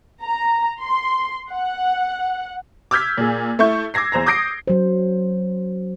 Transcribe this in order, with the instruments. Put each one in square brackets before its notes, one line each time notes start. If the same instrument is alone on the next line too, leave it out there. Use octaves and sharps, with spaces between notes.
[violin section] A#5
C6
F#5
[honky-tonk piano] D6 E6 F6 G6 G#6 B6
A#2 G#4
A3 E4 C#6 G6
D6 E6 G#6 A#6 C7
E2 C5 A#5 A#6
D6 D#6 G6 A#6 C7 D7
[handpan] F#3 C5